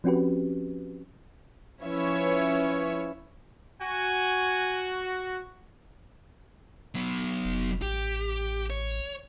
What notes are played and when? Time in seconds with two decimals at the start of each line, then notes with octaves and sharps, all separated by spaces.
0.04 F3 C4 C#4 F#4 G4 B4
1.82 F3 C#4 E4 B4 C#5 E5
3.82 F#4 G#5
6.95 F#3 B3
7.45 F1
7.82 A1 G4
8.70 C#5